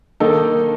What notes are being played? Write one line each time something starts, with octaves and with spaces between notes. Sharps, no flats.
D#3 A#3 D#4 A4